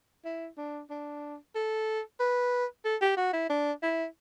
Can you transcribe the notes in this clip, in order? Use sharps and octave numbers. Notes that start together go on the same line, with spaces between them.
E4
D4
D4
A4
B4
A4
G4
F#4
E4
D4
E4